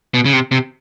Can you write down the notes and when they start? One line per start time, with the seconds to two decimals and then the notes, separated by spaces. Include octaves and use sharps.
0.14 B2
0.25 C#3
0.33 C3
0.52 C3